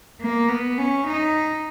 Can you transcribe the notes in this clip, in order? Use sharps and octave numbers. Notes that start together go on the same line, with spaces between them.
A#3
B3
C#4
D#4